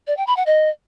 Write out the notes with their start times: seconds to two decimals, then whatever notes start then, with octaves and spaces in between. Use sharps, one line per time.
0.07 D5
0.17 G5
0.27 B5
0.37 F#5
0.46 D#5